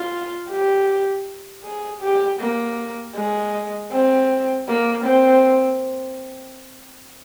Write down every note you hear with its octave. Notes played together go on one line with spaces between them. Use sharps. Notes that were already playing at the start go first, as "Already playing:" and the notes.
Already playing: F4
G4
G#4
G4
A#3
G#3
C4
A#3
C4